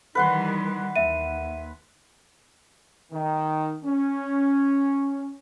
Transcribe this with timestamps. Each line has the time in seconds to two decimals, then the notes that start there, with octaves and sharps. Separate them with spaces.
0.15 D#3 E3 G3 B4 F#5 C6
0.96 D#2 E5 D#7
3.12 D#3
3.84 C#4